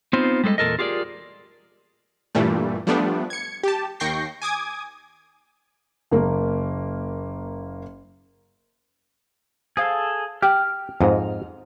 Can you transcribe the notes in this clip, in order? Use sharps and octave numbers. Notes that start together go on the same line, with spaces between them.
B3 C4 D#4 F4 C5
G3 G#3 A4 C5 D#5
E2 A#2 A4 A#4 D#5
F4 G4 G#4 A#4 D5
G2 A#2 E3 G3 A3
F3 G3 A3 B3 D4
G#6 C#7
G4 A5
D#2 G5 C#6 G6 A#6 C7
G#5 D6 D#6 G#6
F#1 A#3
G#4 A4 C5 F5
G4 G5 F6
F2 G#2 D#5